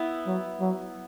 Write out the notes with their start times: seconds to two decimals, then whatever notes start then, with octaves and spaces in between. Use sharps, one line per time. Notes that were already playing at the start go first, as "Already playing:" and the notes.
Already playing: B3 E4
0.27 F#3
0.61 F#3